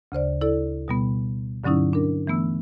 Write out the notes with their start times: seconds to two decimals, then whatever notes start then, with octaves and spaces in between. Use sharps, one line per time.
0.12 D2 C#3 C5 D5
0.41 E4 A4 D5
0.88 B2 G3 B3
1.64 G2 D3 F#3 C#4 D#4 E4
1.93 D4 A#4
2.27 E3 A3 B3 E6